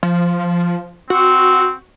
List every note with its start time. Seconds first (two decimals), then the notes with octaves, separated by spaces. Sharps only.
0.03 F3
1.10 C4 F#4